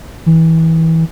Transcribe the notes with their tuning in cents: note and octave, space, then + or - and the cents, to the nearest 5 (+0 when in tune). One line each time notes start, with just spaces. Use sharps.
E3 -25